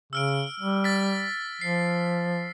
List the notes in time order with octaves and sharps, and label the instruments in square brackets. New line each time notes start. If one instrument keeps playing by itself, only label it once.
[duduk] C#3 [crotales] E6 F6 D7
[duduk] G3
[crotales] A6 B6
[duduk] F3 [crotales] C7